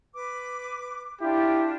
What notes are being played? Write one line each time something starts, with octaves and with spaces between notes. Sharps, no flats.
B4 D6
D4 E4 F4 G4